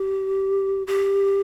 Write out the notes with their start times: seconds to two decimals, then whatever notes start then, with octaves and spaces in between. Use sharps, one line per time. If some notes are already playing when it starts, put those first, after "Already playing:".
Already playing: G4
0.87 G4